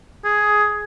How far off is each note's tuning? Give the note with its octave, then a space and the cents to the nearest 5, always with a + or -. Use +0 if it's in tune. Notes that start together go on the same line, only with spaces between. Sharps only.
G#4 +10